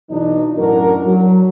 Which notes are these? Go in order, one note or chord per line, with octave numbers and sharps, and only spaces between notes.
B1 E3 F#3 D4 D#4
F#2 A2 D4 F#4 A#4
F#3